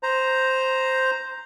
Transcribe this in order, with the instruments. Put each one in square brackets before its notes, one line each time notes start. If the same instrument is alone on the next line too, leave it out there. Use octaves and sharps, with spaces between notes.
[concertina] C5 A#5